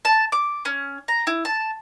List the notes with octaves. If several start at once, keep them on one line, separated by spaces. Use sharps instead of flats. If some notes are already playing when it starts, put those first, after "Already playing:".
A5
D6
C#4
A#5
E4
A5